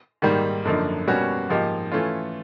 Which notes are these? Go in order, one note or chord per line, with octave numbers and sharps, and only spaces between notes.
G#2 D#3 G3 A#3
F#2 D3 F3 A#3 D#4
B2 G3 A#3 C#4 F#4
G#2 F3 A#3 D#4 G4
E3 A3 C#4 F4